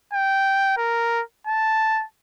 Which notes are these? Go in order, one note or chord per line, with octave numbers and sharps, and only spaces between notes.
G5
A#4
A5